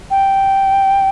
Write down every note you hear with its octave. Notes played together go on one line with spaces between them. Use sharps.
G5